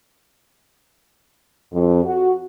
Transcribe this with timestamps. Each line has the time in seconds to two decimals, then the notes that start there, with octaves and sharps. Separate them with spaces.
1.73 F2
2.04 F#4